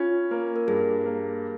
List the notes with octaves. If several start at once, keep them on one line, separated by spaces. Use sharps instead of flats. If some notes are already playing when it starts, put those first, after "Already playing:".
Already playing: C#4 F4
A#3
A#4
G2 G#4
A#3